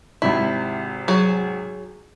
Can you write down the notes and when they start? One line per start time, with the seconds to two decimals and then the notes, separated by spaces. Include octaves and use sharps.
0.22 G#1 C3 E4 B5
1.08 F#3 G#4